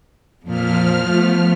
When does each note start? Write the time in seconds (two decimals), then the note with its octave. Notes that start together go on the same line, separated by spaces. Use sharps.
0.45 F2 A#2 F3 F6
1.12 A3 B3